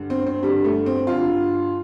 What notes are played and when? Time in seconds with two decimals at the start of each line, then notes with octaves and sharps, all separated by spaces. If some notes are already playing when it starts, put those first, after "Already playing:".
Already playing: G2 D3
0.10 C4
0.27 C4
0.42 G2 D3 G3
0.64 A3
0.86 C4
1.07 G2 D3 F4